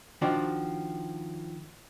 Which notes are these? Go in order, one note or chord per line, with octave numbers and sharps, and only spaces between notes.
D#3 F3 D4 F#4